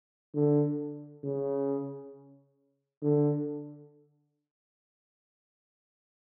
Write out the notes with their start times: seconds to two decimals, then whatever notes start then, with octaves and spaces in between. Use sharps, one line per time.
0.35 D3
1.24 C#3
3.03 D3